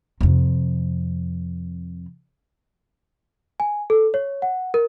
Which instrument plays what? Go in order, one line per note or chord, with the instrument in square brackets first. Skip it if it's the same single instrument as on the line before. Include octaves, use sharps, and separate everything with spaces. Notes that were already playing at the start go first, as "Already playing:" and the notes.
[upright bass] F2 C3
[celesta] G#5
A4
C#5
F#5
A#4